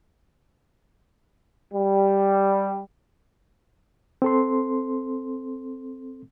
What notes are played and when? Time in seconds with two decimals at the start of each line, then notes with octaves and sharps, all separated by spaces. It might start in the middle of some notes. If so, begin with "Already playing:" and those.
1.74 G3
4.22 C4 A4 C6